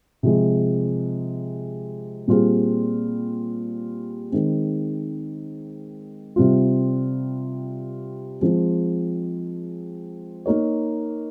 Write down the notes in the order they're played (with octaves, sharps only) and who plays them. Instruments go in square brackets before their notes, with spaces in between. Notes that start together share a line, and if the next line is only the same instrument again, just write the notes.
[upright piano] C3 F3 G#3
A#2 G3 C4 F4 G#4
D#3 G#3 C4
C3 G3 C4 F4
F3 G#3 C4
A#3 D#4 A#4 C#5